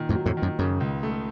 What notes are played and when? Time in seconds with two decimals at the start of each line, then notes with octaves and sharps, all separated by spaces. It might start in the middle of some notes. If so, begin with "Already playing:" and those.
Already playing: A#2 D#3
0.09 F2 A2
0.15 F#3
0.26 F2 A2
0.37 D#3
0.42 F#2
0.59 F#2 C#3
0.80 C#2
1.03 A3